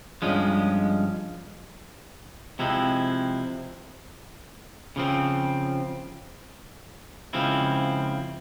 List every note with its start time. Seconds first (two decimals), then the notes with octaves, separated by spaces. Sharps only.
0.22 G2 F3 G#3 C#4
2.59 C3 F3 G#3 C4 E4
4.96 C#3 F3 C4
7.33 C#2 C#3 F3 C4 E4